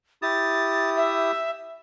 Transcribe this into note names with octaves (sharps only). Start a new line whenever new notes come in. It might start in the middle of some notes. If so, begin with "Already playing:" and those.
E4 G4 D#6 A6
E5